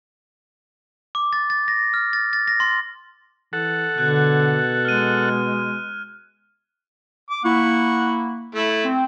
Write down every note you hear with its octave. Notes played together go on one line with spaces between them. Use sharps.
D6
A6
A6
A#6
F6
A6
A6
A#6
C6
E3 A4 F#5
B2 D3 F#6 G#6
G#3 F6 D#7
D6
A#3 E4 F#5 C#6
A3 E4
C4